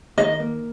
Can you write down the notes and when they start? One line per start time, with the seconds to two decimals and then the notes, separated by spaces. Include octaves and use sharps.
0.18 D#3 D#5
0.40 A#3